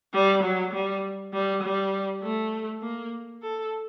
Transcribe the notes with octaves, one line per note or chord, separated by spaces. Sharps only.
G3
F#3
G3
G3
G3
A3
A#3
A4